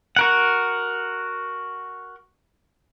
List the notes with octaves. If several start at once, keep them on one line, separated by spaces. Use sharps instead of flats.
F#4 A#4 F#5